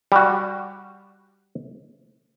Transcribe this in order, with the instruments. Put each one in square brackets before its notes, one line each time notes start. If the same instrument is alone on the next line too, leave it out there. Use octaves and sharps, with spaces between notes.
[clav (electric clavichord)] G3 F#4